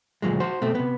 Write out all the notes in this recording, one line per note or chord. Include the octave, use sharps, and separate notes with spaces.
D2 A#2 F3 F#3 G#3
F#4 C5
B2 A3 C4
C3 B3